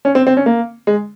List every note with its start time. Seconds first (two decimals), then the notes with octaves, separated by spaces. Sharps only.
0.05 C#4
0.15 C4
0.27 C4
0.37 C#4
0.46 A#3
0.87 G#3